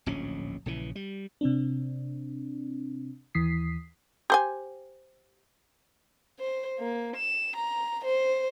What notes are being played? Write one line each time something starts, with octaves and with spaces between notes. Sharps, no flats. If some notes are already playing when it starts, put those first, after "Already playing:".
D1 A#1 G#2 C#4
A#1 C#3 E3
G3
C3 C4 D4
D#2 E3 D#6 B6 C7
G4 C5 G#5
C5
A#3
E7
A#5
C5